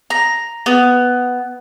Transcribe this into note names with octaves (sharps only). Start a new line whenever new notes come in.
A#5
B3